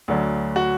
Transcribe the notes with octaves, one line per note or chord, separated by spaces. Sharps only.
D2 D3 F#3
F#4